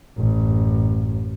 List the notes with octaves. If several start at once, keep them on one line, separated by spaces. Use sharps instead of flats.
A1 F#2